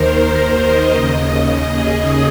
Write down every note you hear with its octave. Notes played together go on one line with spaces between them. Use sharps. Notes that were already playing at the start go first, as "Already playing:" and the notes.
Already playing: D#2 D#3 A#4 C5
C5
D#5
D#2 C#3 D#5
G#4